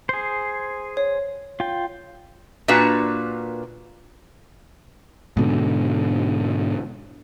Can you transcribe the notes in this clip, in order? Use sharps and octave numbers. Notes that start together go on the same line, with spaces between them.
G#4 C5
C#5
F4 G5
A#2 A#3 D4 F#4 B4 F5
G#2 B2 D3